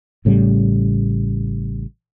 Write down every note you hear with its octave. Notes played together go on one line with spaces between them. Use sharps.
A1 A2 C#3 G3